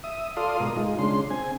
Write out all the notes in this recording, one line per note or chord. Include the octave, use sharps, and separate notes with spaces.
E5 D#6
F4 A4 D5 F5 C6 D#6
G#2 B2 A#4 D#6
G#3 D#4 F4
C#3 G#3 D4 C6
C4 G#5